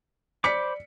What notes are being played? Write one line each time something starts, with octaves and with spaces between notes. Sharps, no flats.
C5 D5 B5 D6 B6 C#7